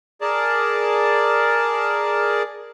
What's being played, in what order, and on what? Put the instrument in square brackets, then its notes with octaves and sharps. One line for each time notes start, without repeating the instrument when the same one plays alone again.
[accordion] G#4 A#4 D5 A5